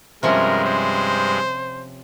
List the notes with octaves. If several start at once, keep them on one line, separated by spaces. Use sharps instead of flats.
G2 C3 F3 G#3 C#4 A#4
C5